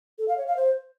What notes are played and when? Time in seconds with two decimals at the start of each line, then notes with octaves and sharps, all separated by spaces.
0.19 A4
0.28 F5
0.38 C#5
0.47 F5
0.57 C5